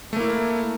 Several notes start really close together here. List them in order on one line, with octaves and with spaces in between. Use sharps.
A3 A#3 E4